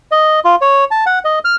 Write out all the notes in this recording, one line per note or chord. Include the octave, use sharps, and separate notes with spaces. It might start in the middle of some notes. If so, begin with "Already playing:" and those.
D#5
F4
C#5
A5
F#5
D#5
F6